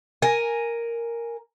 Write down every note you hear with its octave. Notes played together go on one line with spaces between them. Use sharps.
A#4 G#5